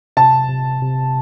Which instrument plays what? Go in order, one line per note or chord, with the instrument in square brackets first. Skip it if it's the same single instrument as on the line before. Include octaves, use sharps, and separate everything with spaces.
[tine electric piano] C3 [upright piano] A5
[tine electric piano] C3
C3